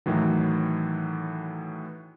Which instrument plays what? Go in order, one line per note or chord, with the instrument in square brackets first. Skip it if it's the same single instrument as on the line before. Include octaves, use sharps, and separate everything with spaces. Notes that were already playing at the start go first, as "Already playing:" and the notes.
[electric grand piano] A2 D#3 E3 F#3